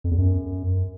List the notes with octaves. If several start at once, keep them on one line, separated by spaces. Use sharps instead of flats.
F2
E2
F#2